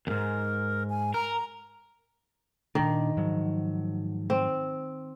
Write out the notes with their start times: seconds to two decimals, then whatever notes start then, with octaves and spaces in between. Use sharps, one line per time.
0.07 D#2 G#2 A#4
0.90 G#5
1.14 A#4 A#5
2.75 A#2 D#3 D4
3.17 G#2 F3 F#3
4.30 C4